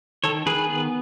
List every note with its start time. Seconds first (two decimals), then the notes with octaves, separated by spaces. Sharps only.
0.24 D#3 A4 C#5
0.46 D#3 G#4 B4
0.69 B3